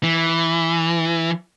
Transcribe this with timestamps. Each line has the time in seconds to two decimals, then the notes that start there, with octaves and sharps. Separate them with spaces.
0.03 E3